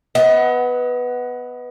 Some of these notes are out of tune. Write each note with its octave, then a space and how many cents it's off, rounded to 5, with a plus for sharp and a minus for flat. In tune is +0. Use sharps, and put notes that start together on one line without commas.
B3 +0 D#5 +35 F#5 +15